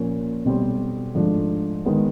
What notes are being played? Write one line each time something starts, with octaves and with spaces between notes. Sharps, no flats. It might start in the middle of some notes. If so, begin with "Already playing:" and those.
Already playing: A#2 F3 A#3 C#4
B1 B2 G3 C4
G#2 F3 A3 D4
D#3 G#3 B3